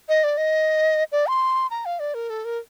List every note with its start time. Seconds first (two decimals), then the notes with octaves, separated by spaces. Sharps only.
0.09 D#5
0.24 D5
0.37 D#5
1.12 D5
1.27 C6
1.71 A#5
1.85 F5
2.00 D5
2.14 A#4
2.30 A4
2.45 A#4